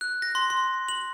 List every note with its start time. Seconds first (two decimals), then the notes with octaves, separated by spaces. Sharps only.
0.01 F#6
0.22 A#6
0.35 C6
0.50 C6
0.89 F#7